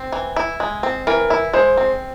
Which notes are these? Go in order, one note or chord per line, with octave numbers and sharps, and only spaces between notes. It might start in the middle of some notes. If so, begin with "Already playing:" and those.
Already playing: C4
E3
E4
G#3
C4
E3 A#4
E4
G#3 C5
C4